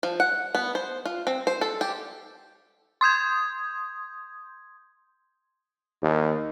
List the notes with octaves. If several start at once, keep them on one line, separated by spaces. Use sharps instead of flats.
F3
F#5
B3
C5
F4
C4
C5
A4
G4
C6 D#6 G6 G#6
D#2